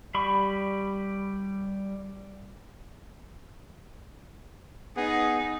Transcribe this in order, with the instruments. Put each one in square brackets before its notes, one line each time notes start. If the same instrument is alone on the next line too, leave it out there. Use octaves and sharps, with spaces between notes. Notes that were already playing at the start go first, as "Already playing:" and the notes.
[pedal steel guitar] G3 B5 C#6
[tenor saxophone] B3 [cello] D#4 [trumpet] G#4